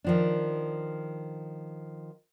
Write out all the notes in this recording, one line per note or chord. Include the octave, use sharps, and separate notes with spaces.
D#3 F3 D4